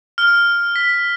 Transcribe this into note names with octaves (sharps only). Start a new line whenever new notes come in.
F6
B6